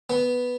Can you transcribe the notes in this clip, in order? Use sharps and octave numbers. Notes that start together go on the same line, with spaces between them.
B3